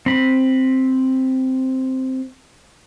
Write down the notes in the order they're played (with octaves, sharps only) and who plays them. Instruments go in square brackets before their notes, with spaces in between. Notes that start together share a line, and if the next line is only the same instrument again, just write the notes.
[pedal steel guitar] C4 B5